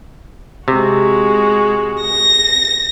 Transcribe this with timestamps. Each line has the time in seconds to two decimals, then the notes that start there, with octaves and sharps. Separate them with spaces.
0.68 C3 G#3 F#4
2.01 A#6